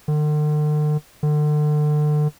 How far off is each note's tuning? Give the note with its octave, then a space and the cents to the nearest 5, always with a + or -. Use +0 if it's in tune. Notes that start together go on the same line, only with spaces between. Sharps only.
D3 +45
D3 +35